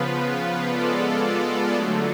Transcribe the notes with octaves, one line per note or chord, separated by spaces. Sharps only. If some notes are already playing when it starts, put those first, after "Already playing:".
Already playing: C#3 F3 B3 F4 B4
G#3 B3 F4 A4 D5
D3 F#3 A3